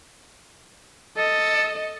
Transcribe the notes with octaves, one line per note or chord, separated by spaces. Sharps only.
A4 D#5